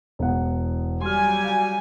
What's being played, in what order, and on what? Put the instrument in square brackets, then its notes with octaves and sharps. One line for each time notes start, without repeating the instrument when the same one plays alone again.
[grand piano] E1 E2 F#5
[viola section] F#3 G3 G#5 [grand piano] C6 F6
[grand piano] F5